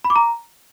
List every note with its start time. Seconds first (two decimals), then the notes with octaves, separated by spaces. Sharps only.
0.04 B5
0.10 D6
0.16 A#5